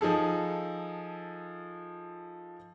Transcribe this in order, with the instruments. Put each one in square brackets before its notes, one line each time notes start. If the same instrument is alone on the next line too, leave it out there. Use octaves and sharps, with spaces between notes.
[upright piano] F3 D#4 G#4 A4